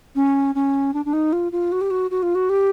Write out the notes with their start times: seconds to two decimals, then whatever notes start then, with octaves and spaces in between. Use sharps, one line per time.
0.16 C#4
0.55 C#4
0.94 D4
1.05 D4
1.13 D#4
1.33 F4
1.52 F4
1.72 F#4
1.81 G4
1.91 F#4
2.11 F#4
2.23 F4
2.35 F#4
2.49 G4